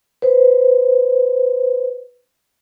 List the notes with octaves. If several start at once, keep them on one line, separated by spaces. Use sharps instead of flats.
B4 C5